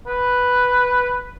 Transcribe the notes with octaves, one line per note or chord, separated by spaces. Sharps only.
B4